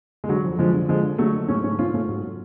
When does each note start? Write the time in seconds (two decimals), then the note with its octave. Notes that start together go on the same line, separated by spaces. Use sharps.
0.24 G#3
0.29 D3 F#3
0.44 F2
0.59 D3 F3 G#3
0.74 D3
0.88 D3 F3 G#3
1.03 D3
1.18 D3 F#3 A3
1.33 D3
1.48 G#2 A3 C#4
1.63 G#2 A3 C#4
1.79 G#2 C#4 F4
1.94 G#2 A3 C#4
2.09 G#2 F#3